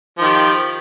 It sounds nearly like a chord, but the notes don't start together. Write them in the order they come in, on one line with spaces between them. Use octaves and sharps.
F3 D#3 G4